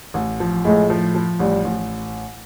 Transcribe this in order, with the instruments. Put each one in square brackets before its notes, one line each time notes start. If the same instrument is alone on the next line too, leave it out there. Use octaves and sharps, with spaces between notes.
[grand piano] A1
F3
[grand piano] A2 [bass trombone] G#3
[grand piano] F3
F3
[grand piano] A1 [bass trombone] G3
[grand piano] A1